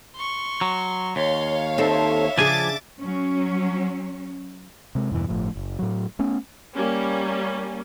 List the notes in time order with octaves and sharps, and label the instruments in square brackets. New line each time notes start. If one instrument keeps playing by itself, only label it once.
[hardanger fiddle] C6 C#6
[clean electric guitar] F#3
[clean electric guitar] D#2 [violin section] C#5 F5 [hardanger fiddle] C6
[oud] C4 D#4 A4 [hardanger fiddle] E5
[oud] C#3 D4 G#4 [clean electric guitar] F3 G#5 [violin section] D6 A6
[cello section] F#3 C#4
[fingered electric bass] C3 G#3
E2 G2 B2 E3
G1 A2 F3
F#1
A2 F#3
A3 B3 C#4
[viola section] G3 A#3 C#4